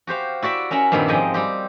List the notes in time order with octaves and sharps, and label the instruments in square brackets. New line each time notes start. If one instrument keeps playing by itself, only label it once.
[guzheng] F#4 G4 C5 F5
E4 F#4 D5 E5
C#4 A#4 E5 F#5
G2 A#2 D#3 G3 C4 E4
G#2 F3 G#3 D#5 G5
G3 C4 G4